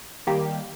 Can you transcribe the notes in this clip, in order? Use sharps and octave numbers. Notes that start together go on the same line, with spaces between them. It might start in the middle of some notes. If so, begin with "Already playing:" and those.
D#3 G3 A#3 G4